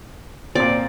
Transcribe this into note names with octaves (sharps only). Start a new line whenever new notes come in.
A#2 C4 D5